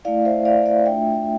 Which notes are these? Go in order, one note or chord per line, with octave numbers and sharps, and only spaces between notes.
A3 E4 D5 F5
C5 E5
D5 F5
D5 F5
A3 D4 F4 E5 G5